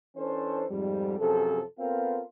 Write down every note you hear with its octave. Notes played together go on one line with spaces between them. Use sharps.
E3 C#4 D4 A4 C5
F2 G#2 G3
F#2 C3 F3 G#4 A4
B3 C4 F4 A4 A#4 F5